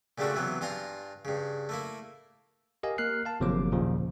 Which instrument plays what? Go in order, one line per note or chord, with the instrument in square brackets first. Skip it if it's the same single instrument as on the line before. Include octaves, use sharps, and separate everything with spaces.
[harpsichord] A#2 C#3 G3 A3 D4 F#4
C3 E3 F#3 B3
G2 F4 G#5 A#5 C6
G2 C#3
A3 A#3 E4
[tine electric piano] G4 A#4 D#5 F5 G#5
A#3 A#4 F6 F#6 C7
F5 A5
G1 C3 F3 F#3 A#3 D6
D#2 A#2 C#3 F3